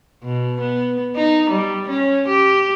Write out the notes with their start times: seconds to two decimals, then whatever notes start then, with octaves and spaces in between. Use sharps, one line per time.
0.23 B2
0.61 B3
1.15 D#4
1.50 G3
1.89 C#4
2.28 G4